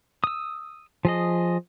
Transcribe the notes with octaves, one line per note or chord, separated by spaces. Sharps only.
D#6 E6
F3 G#4 D#5